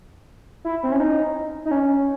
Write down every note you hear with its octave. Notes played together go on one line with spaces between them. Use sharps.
E4
C4
C#4
D#4
D#4
C#4